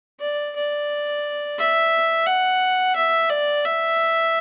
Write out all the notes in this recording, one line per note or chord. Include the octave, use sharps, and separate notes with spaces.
D5
D5
E5
F#5
E5
D5
E5